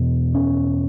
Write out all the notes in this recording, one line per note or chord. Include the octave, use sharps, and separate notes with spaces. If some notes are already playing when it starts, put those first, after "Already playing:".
Already playing: E2 B2
C#4